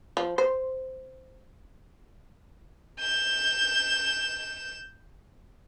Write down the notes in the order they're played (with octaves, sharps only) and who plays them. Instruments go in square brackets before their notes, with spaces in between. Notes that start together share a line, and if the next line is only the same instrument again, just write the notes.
[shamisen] F3
C5
[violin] G6 E7